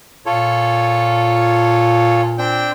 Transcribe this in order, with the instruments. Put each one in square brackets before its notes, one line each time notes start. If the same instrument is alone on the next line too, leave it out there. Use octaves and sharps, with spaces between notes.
[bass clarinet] A#2 [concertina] F4 A4 C#5
[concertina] C4 D4 G5